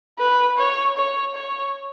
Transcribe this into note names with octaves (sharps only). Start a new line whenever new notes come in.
B4
C#5
C#5
C#5